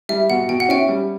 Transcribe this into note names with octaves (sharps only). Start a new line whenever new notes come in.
G3 E5
B2 F#5
B2 G5
F#5
C#4 E5 G5
G3